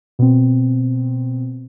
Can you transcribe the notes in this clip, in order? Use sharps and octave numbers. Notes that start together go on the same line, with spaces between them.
B2 C4